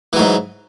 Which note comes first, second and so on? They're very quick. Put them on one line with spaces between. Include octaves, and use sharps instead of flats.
E3 F#3 G#2